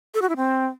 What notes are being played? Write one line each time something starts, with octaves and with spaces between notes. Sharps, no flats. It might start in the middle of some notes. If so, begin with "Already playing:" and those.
A4
F#4
E4
C4